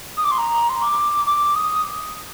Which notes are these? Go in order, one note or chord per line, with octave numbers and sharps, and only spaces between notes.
D#6
D6
C6
A#5
C6
D6
D6
D#6